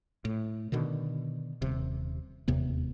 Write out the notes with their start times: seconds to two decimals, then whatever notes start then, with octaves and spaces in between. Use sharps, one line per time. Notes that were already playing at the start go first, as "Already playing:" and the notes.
0.25 A2
0.72 B2 D3 D#3
1.62 D#1 C3
2.48 E1 D#2 C3 B3